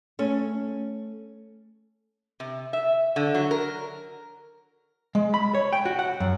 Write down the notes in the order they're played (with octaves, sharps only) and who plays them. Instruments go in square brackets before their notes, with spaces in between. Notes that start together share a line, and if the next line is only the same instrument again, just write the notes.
[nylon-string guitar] A3 C#4
[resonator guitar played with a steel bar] C3
E5
D3
F#3
A#4
[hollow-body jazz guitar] G#3
B5
C#5
G5
F#4
F#5
F#2